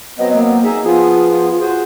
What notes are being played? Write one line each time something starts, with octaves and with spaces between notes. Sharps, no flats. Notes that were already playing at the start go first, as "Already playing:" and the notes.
F#3 B3 C4 D#5
A#3
D#4 G#4 E5
F3 B3 F4 G#4
F#4 G#4 C5